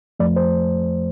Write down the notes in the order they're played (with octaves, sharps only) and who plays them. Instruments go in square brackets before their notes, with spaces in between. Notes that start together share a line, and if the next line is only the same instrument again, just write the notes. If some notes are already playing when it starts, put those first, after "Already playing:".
[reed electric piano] F2 F3 A3 D5
C5